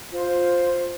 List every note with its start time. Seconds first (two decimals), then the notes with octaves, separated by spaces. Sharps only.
0.12 F4 C5